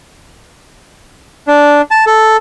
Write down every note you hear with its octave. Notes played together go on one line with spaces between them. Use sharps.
D4
A5
A4